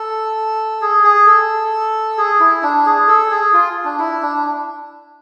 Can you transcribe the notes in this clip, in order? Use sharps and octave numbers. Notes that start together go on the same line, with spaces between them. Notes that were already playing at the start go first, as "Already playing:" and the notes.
Already playing: A4
G#4
G#4
A4
G#4
E4
D4
G#4
A4
G#4
F4
D4
E4
D4